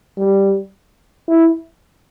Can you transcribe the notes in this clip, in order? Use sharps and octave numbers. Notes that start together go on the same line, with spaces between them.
G3
E4